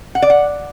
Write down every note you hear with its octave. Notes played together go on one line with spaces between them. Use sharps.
F#5
D5
F#5